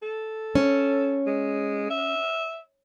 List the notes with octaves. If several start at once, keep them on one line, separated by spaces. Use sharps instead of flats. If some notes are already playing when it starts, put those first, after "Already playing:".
A4
C#4
G#3
E5